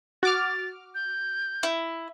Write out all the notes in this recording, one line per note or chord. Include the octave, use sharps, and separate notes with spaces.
F#4 D6 F6 A6
G6
E4